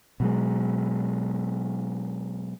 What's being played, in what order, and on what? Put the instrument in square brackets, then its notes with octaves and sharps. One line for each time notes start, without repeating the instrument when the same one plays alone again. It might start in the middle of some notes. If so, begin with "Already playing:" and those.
[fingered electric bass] B2 F#3 G#3